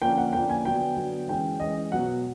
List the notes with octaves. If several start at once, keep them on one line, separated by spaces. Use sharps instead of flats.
D3 F3 A#3 C#4 G5
F#5
D3 F3 A#3 C#4 G5
G#5
D3 F#3 B3 G5
D3 F#3 B3
E3 G#3 C#4 G5
E3 G#3 C#4 D#5
B2 F#3 B3 F#5